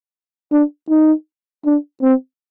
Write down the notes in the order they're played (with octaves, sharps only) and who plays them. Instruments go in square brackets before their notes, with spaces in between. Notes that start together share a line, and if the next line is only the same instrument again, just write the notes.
[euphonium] D4
D#4
D4
C4